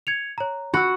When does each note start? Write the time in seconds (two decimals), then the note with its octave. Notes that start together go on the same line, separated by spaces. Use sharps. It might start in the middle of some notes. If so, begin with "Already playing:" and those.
0.07 G#6 C#7 F7
0.38 C#5 A#5
0.74 F#4 B5 E6